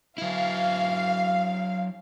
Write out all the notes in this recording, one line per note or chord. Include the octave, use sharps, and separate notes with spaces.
F#3 E4 F5